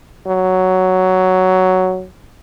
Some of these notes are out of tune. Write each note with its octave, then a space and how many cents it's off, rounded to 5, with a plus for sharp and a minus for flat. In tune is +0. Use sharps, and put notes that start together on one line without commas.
F#3 +5